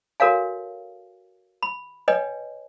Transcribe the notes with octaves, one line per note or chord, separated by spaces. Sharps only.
F#4 A4 A#4 C#5 F5 G#5
B5
B4 C#5 D#5 G5 G#5